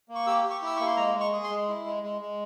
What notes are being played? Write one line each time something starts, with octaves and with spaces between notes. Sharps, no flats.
A#3
C#6
G4 E6
G4
C#6
E4 E6
A#3 C#6
C6
G#3 A#5
G#3
C#6
G#4
C6
G#3
E4
G#3
G#3
G#3